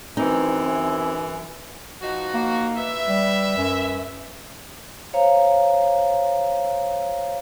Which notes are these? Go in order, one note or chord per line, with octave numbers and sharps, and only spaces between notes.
F#2 E3 C4 D#4 G#5
F3 D#4 F#4
A#3
B4 E5
G3
F#2
C5 C#5 F5 A#5